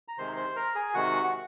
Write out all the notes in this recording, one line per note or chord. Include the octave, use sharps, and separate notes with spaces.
A#5
C3 D#3 G#3 C5 C6
C5 C6
A#4 A#5
G#4 G#5
C3 D#3 G#3 F#4 F#5
F#5